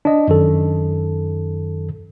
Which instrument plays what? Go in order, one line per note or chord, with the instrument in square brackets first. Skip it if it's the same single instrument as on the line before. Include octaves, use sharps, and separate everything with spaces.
[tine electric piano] D4 D#5
F#2 D#3 A4